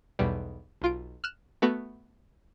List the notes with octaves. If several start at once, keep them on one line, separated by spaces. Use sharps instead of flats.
B1 E2 B2 G3
B1 F4 D7
F6 F#6 E7
A3 B3 F#4